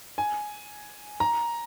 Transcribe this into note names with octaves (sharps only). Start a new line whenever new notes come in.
G#5
A#5